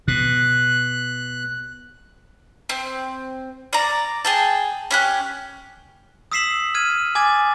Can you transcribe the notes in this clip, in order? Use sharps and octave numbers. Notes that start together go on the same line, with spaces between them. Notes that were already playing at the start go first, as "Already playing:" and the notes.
B2 F#6
C4
D5 A#5
G#4 G5 A5
C#4 G4 F#6
D#6 E6 B6 C7 E7 F#7
F6 G#6 D#7
G#5 D6 G#6 A6